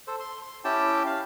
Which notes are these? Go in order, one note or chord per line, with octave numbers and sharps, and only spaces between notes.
A4 C5
C6
C6
C#4 E4 G4 G5 A5
F5